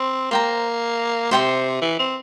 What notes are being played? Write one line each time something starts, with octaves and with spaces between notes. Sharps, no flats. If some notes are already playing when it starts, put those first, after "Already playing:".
Already playing: C4
A#3 C5 G5 A#5
C3 C5 G5 C6
E3
C4